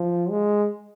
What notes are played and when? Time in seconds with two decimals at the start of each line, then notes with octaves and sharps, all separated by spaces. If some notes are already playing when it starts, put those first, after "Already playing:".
Already playing: F3
0.30 G#3